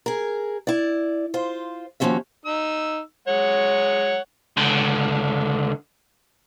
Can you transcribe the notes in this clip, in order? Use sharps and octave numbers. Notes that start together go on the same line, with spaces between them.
G#4 A#4
E4 D5
F4 C5
D#2 D3 F3 C#4 F#4 E5
D#4 E6
G#3 C#5 F#5
C#2 D3